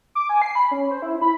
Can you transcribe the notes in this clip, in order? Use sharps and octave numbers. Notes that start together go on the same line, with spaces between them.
D6
G#5
C7
B5
C#4
C5
E4
B5